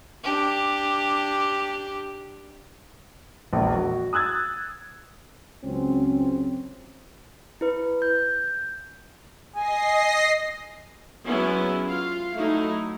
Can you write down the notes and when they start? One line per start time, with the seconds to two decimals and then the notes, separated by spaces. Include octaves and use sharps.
0.24 D4 G4
3.53 E1 A#1
3.75 F#4
4.13 D#6 E6 F#6 G#6 A6
5.64 C#2 F#3 C4 C#4
7.61 E4 B4
8.02 G6
9.56 D#5 G#5 A#6 C7
11.27 F#3 G#3 B3 C#4 E4
11.88 F4 F5
12.36 F#3 A3 D#4 E4